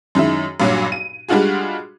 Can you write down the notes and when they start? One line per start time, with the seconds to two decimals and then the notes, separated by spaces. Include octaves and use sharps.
0.15 F#2 D#3 G#3 E4
0.60 B1 G2 A#2 F#3
0.92 D#7
1.29 G3 G#3 D4 F4 F#4 G#4